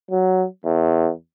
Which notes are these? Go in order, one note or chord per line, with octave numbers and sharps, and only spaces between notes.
F#3
E2